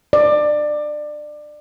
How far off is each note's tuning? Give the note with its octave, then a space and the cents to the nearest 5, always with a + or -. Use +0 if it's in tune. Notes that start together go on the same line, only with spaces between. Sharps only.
D5 +25